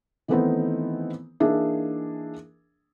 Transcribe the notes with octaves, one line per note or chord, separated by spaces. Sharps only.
D#3 E3 A3 B3 C4 D#4
E3 A#3 D4 D#4 G#4 E5